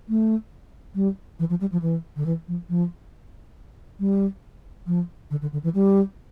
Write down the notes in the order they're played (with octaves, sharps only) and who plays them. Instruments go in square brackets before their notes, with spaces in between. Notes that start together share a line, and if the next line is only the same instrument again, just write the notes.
[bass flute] A3
G3
E3
F3
G3
F3
E3
D3
E3
F3
F3
G3
F3
D3
D3
D3
E3
G3